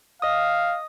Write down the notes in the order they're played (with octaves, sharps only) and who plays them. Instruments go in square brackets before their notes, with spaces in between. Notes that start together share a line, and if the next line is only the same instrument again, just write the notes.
[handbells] D#5 D#6 [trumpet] F5